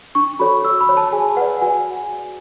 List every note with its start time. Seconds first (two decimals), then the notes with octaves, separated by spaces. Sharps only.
0.15 D4 C#6
0.39 F#4 A4 C#5 B5
0.64 F#4 E6
0.81 B5
0.89 C#5
0.97 A5
1.12 G#4 G#5
1.37 B4 D5 F#5
1.62 F#4 G#5